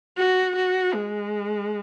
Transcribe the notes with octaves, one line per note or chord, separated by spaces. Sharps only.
F#4
F#4
G#3